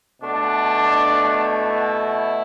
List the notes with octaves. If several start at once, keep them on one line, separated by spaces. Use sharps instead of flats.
B2 A3 D4
E4